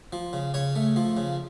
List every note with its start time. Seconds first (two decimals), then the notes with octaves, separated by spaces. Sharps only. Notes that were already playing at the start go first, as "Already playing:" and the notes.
0.13 F3
0.33 C#3
0.54 C#3 C#5
0.75 A3
0.96 F3
1.17 C#3